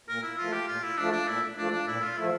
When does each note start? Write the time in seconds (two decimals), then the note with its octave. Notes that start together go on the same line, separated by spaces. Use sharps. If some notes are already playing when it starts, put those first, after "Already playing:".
0.08 A#2 A#4
0.23 E4
0.38 F3 A3 F4
0.53 G4
0.67 A#2 F4
0.83 E4
0.97 F3 A3 D4
1.12 D4
1.27 A#2 E4
1.57 F3 A3 D4
1.72 D4
1.87 A#2 E4
2.02 F4
2.17 F3 A3 E4